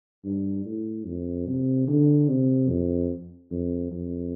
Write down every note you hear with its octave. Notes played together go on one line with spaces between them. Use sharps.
G2
A2
F2
C3
D3
C3
F2
F2
F2